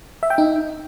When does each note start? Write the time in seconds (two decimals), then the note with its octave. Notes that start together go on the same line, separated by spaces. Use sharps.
0.23 E5
0.30 G5
0.38 D#4